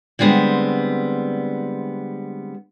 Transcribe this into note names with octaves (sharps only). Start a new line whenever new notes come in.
D3 G3 G#3 B3 C4